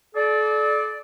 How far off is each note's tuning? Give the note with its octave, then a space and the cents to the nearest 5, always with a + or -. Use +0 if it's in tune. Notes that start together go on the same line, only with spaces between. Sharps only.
A4 -40 D5 +0